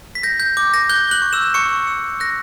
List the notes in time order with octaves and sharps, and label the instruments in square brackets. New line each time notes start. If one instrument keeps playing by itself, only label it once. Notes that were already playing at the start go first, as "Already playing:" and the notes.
[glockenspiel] B6
G6 A#6
G6
D6 G6
A#6
F#6 G6 G7
F#6 F#7
C#6
E6 E7
C#6 G6 C#7
E6
F#6 A#6